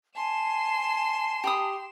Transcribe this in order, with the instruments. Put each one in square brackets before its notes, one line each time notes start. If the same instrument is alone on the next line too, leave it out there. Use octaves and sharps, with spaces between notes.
[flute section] G#5 A5 [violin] C6 E7
[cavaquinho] G4 B5 D#6